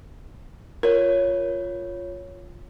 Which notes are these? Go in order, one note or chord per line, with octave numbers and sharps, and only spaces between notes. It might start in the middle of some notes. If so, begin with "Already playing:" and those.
F4 A#4 C#5